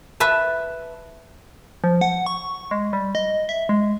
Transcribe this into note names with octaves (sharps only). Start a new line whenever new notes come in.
B4 E5 A5
F3
F#5
C#6
G#3
G3
D#5
E5
G#3